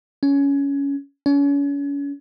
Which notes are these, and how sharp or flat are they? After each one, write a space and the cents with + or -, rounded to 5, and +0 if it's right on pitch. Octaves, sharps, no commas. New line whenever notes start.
C#4 +15
C#4 +35